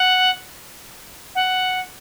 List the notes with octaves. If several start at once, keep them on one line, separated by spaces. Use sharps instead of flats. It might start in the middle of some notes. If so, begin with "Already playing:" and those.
Already playing: F#5
F#5